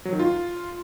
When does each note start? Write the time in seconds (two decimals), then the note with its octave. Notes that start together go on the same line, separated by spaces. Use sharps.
0.05 F#3
0.12 D#3
0.19 F4